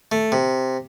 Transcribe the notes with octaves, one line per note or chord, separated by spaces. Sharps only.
A3
C3